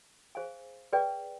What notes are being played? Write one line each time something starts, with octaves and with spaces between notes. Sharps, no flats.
G#4 C5 F5 G#5
G#4 B4 D5 G5